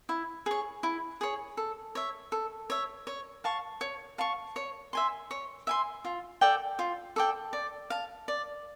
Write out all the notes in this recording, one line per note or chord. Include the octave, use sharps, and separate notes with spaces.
E4
G#4 C#5
E4
G#4 C#5
A4
C#5 E5
A4
C#5 E5
C#5
F5 A5 C#6
C#5
F5 A5 C#6
C#5
E5 G#5 C6
C#5
E5 G#5 C6
F4
A4 D5 G5
F4
A4 D5 G5
D5
F5 A5
D5